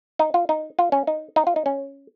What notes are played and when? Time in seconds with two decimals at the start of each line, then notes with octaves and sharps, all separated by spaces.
0.19 D#4
0.34 F4
0.49 D#4
0.79 F4
0.92 C#4
1.07 D#4
1.36 D#4
1.47 F4
1.56 D#4
1.66 C#4